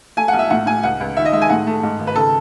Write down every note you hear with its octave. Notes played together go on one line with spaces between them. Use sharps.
A3 G#5
F#5
B1
E5
A2 F#5
A2 G#5
C#2 F#5
C#2
D#3 E5
D#5
G#3 E5
G#5
A2 F#5
A3
G#2
G#1
B4
C#3 A4